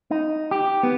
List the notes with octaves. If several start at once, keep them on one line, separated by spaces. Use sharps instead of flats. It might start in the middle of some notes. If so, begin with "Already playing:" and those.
D#4
G4
B3